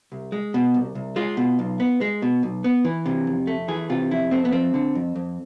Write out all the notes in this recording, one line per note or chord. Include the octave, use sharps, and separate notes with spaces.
C2
G#3
B2
C2
C2
G#3 F4
B2
B1
B3
G#3
B2
B1
B3
E3
C3
F2
A3
E3 G#4
C3 F4
F2 E4
A3 C4
B3
F3 C4
D3
F2
F2